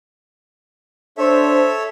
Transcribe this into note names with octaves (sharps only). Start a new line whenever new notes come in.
D4 A4 C5 C#5 E5